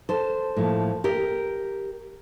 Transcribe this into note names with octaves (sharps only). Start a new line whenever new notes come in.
A4 C5
A2 F3 A#3
G4 A#4